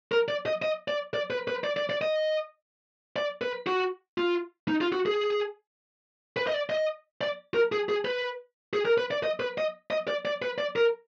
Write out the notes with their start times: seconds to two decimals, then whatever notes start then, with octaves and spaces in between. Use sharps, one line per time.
0.12 A#4
0.29 D5
0.46 D#5
0.62 D#5
0.88 D5
1.14 D5
1.30 B4
1.48 B4
1.64 D5
1.77 D5
1.90 D5
2.02 D#5
3.16 D5
3.41 B4
3.67 F#4
4.18 F4
4.68 D#4
4.81 F4
4.93 F#4
5.06 G#4
6.37 B4
6.47 D#5
6.54 D5
6.70 D#5
7.21 D5
7.54 A#4
7.72 G#4
7.89 G#4
8.05 B4
8.73 G#4
8.85 A#4
8.98 B4
9.11 D5
9.24 D#5
9.40 B4
9.58 D#5
9.91 D#5
10.08 D5
10.25 D5
10.42 B4
10.58 D5
10.76 A#4